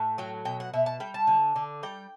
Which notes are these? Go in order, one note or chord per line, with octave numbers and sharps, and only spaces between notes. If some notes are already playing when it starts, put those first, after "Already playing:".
Already playing: A2
F#3 G5
B2 G5
F#5
B2 E5
A5
G3 G5
A5
D3
D3
G3 G5